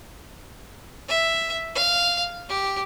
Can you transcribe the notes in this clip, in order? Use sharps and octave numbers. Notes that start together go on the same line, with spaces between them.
E5
F5
G4